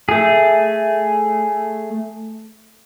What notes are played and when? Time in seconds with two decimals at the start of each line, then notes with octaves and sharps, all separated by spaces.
0.09 A3 G#4